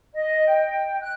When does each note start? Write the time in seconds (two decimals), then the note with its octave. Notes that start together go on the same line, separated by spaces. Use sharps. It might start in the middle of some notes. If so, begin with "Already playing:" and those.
0.14 D#5
0.47 G5
1.02 F#6